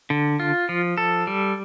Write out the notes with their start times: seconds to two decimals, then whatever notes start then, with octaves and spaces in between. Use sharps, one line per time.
0.10 D3
0.40 F4
0.69 F3
0.98 A4
1.27 G3